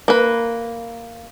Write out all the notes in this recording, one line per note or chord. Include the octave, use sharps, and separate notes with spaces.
A#3 B4